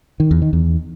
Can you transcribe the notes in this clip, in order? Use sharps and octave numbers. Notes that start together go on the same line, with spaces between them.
D#3
E2
D#3
E2